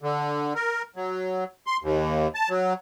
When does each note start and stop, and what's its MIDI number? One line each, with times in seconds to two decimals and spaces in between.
0.02 0.54 50
0.55 0.82 70
0.96 1.44 54
1.67 1.77 84
1.83 2.28 39
2.35 2.49 81
2.50 2.73 54